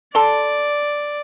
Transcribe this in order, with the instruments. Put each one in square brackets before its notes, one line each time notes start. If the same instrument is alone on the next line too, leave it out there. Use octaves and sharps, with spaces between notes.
[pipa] A4 C6 [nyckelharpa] D5